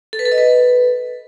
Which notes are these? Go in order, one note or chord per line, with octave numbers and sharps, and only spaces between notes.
A4
B4
A4
D#5
B4